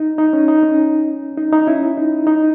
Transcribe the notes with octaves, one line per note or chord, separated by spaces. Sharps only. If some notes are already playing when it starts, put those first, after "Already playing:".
Already playing: D#4
D#4
C#4
D#4
C#4
D#4
D#4
C#4 E4
D#4
D#4